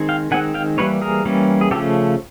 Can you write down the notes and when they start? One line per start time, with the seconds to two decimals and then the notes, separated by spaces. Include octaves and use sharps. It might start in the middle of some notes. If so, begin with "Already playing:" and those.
Already playing: D#3 G#3 C4
0.09 F5 G5
0.31 D#3 G#3 C4 F#5 G#5
0.54 F5 G5
0.78 E3 G3 A#3 C#4 B4 C#5
1.02 G#4 A#4
1.25 E3 G3 A#3 C#4
1.61 G#4
1.71 C#3 F3 A3 C#4 G4 A4